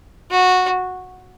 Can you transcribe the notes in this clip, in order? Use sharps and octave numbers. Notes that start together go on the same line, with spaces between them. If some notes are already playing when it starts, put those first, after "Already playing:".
F#4